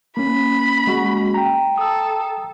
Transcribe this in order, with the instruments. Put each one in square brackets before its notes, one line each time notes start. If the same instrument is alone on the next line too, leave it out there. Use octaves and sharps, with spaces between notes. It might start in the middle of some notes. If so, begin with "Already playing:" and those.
[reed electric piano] A#3 C#4 [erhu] B5
[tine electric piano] G#3 F#4
G5 A#5
[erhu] A4 [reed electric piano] D#6 E6